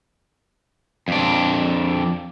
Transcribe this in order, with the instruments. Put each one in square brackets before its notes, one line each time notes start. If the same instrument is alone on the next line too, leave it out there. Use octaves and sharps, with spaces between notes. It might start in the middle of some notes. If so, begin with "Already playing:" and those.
[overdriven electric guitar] F2 D4